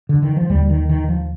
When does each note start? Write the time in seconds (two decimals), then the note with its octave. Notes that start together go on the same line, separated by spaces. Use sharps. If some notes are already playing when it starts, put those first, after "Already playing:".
0.09 D3
0.22 D#3
0.36 F3
0.49 D#2 D3 G3
0.70 D#3
0.89 D#3
1.09 F3